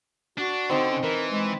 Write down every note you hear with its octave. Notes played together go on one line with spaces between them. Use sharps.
D4 F#4
D3 C4 D#4
C#4
E3 A#4
G#3